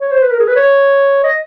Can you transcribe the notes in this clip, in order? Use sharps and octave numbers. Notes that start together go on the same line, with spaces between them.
C#5
C5
B4
A#4
G#4
B4
C#5
D#5